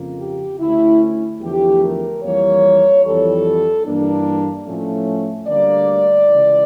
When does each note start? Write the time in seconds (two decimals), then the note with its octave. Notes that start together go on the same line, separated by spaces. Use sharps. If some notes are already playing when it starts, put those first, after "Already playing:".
Already playing: F2 C#3 F3 A#3
0.19 G4
0.60 D2 D3 A3 C#4 E4
1.42 E2 D3 F3 A3 G4
1.82 A#4
2.23 F2 E3 G3 A#3 C#5
3.04 F2 E3 G3 A4
3.85 G2 E3 A#3 D4
4.66 A2 F3 A3 C#4
5.47 D2 D3 G3 A#3 D5
6.28 C#2 C#3 E3